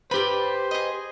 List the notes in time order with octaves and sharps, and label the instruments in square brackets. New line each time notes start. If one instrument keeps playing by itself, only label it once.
[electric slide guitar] G4 B4 [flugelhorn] C5 [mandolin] D5 B5
[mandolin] G#4 D#5